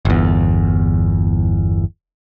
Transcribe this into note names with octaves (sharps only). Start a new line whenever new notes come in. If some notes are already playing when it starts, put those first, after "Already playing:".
G1 E2